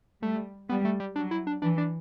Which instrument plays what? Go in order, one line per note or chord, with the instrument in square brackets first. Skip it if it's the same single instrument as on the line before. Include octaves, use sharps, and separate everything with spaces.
[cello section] G3 [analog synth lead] A3
[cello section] G3 [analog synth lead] B3
[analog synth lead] A3
G3
[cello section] F#3 [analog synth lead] D4
[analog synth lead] E4
D4
[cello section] E3 [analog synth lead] D4
[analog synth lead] D4